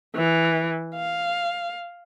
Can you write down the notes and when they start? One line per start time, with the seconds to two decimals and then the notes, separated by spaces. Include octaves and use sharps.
0.16 E3
0.95 F5